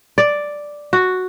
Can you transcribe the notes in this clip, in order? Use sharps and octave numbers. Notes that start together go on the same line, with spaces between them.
D5
F#4